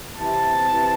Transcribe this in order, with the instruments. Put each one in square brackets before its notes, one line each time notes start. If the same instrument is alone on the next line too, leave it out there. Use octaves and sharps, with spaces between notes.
[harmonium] C3 E3 C4 E4 [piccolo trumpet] A5
[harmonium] C3 E3 C4 E4